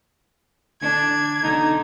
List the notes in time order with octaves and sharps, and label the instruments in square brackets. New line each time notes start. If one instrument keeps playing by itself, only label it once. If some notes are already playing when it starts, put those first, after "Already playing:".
[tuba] D3 [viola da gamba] D4 [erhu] G#6
[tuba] B1 [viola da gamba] D3 [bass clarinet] D#4